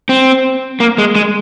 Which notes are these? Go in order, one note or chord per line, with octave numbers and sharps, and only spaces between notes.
C4
A#3
G#3
G#3